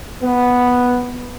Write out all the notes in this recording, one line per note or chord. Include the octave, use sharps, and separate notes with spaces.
B3